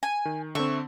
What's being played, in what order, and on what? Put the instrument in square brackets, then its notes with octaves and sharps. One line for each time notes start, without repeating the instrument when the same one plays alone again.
[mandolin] G#5
[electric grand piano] D#3
[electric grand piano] D3 C4 [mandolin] E5 C#6